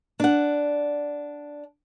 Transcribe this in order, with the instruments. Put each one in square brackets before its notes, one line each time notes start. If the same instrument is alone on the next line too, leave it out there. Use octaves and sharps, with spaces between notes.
[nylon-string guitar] D4 F#5